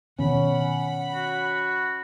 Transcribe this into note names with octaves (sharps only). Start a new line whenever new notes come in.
B2 D#3 B3 C#4 F#5 B5
F#4